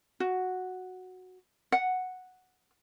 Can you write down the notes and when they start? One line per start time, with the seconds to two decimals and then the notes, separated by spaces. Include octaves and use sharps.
0.20 F#4
1.72 F#5